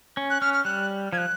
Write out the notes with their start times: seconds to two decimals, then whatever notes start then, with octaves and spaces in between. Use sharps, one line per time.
0.17 C#4
0.30 F#6
0.41 C#4 F6
0.54 F6
0.65 G3 F#6
1.12 F3 G#6
1.18 F#6